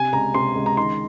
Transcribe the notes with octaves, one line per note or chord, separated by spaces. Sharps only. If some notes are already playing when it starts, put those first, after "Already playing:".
Already playing: C3 G#5
C#2 A#5
C3 C6
C#2
A#5
D#3 C6